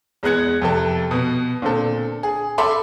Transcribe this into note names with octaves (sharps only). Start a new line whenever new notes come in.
E2 G#3 B3 F#6 G#6 C#7
F2 C3 A4
B2 B3
A#2 D3 C4 A4
G#4
A4 E5 B5 C6 D6